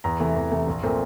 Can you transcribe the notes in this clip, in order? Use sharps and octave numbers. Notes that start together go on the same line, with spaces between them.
E2 A#5
C3 E3 A3
E2
C3 E3 A3
A#1
A#2 A3 C4